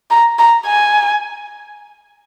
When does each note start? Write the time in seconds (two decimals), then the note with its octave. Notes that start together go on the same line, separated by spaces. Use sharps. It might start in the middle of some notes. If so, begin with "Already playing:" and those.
0.11 A#5
0.39 A#5
0.67 G#5